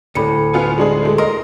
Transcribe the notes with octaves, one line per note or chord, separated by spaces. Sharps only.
D2 A2 A4 B5 C#7
B3 F4 G#5
G#3 D4 G#4
G#3 A3 A4
A#4 D#5 C6